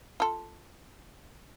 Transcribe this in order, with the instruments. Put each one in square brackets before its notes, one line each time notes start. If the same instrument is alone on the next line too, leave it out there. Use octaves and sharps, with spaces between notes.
[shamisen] F4 A4